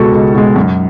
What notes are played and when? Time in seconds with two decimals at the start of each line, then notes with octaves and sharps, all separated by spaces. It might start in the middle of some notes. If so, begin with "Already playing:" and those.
Already playing: C#2 B2 G#3 F#4 A4
0.13 C#2
0.34 B2 G#3
0.56 F#2